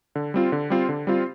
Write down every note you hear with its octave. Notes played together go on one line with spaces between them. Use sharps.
D3
G3 C4 F4
D3
G3 C4 F4
D3
G3 C4 F4